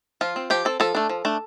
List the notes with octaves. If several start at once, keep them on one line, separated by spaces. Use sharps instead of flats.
F3 F4
C4
F3 G4
C4 A4
F3 A4
A3 D4
F3
A3 D4